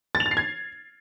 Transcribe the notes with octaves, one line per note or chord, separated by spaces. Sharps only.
A6
F7
A6
C7
G#6